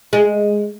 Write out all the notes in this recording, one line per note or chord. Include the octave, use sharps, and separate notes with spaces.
G#3